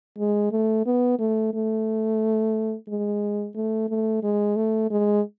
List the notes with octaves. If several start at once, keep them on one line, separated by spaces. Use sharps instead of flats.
G#3
A3
B3
A3
A3
G#3
A3
A3
G#3
A3
G#3